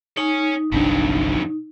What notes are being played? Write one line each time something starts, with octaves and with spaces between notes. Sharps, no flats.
D#4 C#5 G#5
G1 C2 F2 F#3 D4